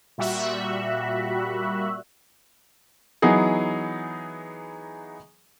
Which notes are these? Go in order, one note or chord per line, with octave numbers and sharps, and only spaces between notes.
A#2 G3 F#4 E5 F#6
E3 F#3 B3 D#4 G#4